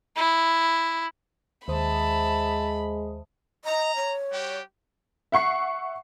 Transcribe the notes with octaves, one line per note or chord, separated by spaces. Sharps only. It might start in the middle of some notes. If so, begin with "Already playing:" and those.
E4
D#2 G#3 C5 E5 A5 B5 D#6
D#5 A#5
C#5
G3 F#4 G4
E5 F#5 C#6 C7